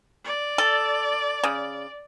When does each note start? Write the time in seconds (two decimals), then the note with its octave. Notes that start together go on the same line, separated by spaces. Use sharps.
0.25 D5
0.58 A4
1.44 C#3